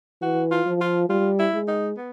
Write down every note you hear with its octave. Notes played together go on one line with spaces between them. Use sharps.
E3 F#4
F4
F3
F4
G3 F4
E4
G#3
D#4
B3